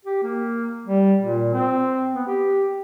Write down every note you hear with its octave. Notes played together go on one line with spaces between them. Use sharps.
G4
A#3
G3
A#2
C4
B3
G4